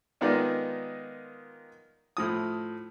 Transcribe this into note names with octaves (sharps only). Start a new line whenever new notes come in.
D#3 G#3 B3 D#4 F4 D5
A2 F3 D#6